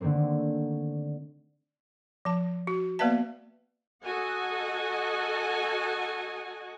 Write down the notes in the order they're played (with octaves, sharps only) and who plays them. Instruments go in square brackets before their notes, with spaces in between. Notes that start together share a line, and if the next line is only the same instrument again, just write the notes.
[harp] D3 D#3 A3 A#3 C4
[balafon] F3 A5
F#4
A#3 B3 B4 D5 E5 A5
[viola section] F#4 A4 D#5 F#5 G#5